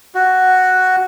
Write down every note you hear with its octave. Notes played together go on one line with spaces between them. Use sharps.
F#4